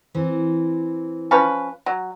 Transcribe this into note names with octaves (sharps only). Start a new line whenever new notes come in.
E3 C4
F3 C#4 B4
F#3